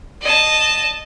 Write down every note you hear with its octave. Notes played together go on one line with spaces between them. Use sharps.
D#5 A5